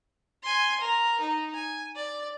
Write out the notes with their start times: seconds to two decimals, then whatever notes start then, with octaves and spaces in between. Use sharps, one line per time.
0.43 G#5 C6
0.80 A#4
1.20 D#4
1.54 G#5
1.96 D5